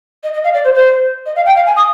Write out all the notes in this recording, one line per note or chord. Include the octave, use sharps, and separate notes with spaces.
D#5
D#5
F5
D5
C5
C5
D#5
F5
G5
F5
G#5
D#6